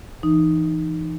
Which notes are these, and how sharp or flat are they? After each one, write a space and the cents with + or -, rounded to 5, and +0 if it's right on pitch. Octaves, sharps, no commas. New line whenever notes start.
E3 +10 D#4 -10